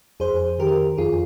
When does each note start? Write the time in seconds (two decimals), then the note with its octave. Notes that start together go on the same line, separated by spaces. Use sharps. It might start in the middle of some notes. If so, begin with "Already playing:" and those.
0.20 F2 G#4 C5
0.59 D#3 G4 A#4
0.98 F2 F4 G#4